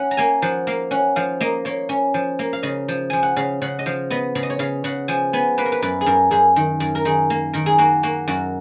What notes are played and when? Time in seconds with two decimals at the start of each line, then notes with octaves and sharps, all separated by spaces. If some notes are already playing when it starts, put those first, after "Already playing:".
Already playing: C#4 F#5
0.11 A#5
0.17 A#3 G#5
0.42 F3 F#5
0.67 A#3 F5
0.91 C#4 F#5
1.16 F3 F5
1.41 A#3 D#5
1.65 A#3 C#5
1.89 C#4
2.14 F3
2.39 A#3
2.53 F5
2.63 C#3 D#5
2.88 F3
3.10 F3 G#5
3.23 F#5
3.36 C#3 F5
3.62 C#3 F#5
3.79 D#5
3.86 F3 F5
4.10 B3 D#5
4.35 C#3 C#5
4.43 D#5
4.50 C#5
4.59 C#3 F5
4.84 C#3 F#5
5.08 F3 G#5
5.33 B3 G#5
5.58 A#3 B4
5.66 A#4
5.72 B4
5.82 F#2 B4
6.01 G#4
6.06 F#2 A#4
6.31 F#2 G#4
6.56 D#3
6.80 F#2
6.95 A#4
7.05 D#3 G#4
7.30 A#3
7.53 D#3 A#4
7.66 G#4
7.78 A#3 F#4
8.03 A#3 F#4
8.28 F#2 F#4